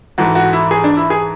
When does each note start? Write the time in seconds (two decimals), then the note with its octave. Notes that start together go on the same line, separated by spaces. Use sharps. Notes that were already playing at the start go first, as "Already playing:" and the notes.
0.18 G#2 E3 A3 F#4
0.35 F#4
0.53 E4
0.71 G#4
0.84 D4
0.97 E4
1.10 G#4